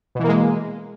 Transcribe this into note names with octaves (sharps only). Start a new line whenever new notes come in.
B2 E3 G#3 A#3